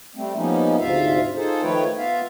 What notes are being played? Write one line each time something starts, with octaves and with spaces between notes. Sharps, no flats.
G3 A3 C4
F3 G3 A#3 B3 C#4 D#4
D2 G#2 C3 F4 E5 F5
D#4 F4 G#4 A4 C5
D#3 F3 A3 B4 C#5 G5
B3 F4 E5 F5